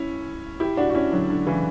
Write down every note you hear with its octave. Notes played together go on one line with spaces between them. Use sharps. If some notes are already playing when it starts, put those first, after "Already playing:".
Already playing: C#4 E4
E4 G4
D4 F#4
F#4
C#4 E4
D3 F#3
D3
C#3 E3